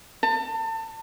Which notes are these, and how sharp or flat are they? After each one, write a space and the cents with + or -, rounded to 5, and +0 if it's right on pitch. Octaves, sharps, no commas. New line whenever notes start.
A5 +30